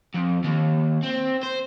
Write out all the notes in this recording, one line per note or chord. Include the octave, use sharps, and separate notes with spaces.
F2
D#2
C4
C5